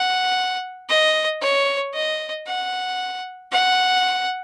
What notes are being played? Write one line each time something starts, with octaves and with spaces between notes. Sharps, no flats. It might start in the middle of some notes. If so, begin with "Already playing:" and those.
Already playing: F#5
D#5
C#5
D#5
F#5
F#5